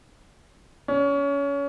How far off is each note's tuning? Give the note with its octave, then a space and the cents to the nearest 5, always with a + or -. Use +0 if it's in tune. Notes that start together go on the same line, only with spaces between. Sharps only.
C#4 +25